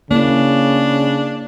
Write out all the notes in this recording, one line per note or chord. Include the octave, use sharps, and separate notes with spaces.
C#3 A#3 D4 E4